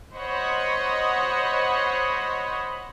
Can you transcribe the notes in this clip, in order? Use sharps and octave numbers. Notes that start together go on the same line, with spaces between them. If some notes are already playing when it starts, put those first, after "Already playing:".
C5 C#5 D#5 F#5 B5